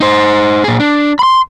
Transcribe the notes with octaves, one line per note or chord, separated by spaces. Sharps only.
D#4 C5
A#2 G#4
D4
B5 C6